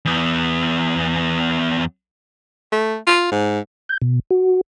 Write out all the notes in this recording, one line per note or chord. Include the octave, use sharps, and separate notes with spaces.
E2 B3
A3
F4
G#2
G6
B2
F#4